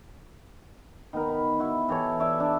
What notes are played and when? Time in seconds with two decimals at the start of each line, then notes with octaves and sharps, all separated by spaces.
1.13 D#3 B3 A#4
1.29 B5
1.59 E4 F#4
1.89 E3 G4 A4 C#5
2.20 D5 E5 C#6 D6
2.40 D4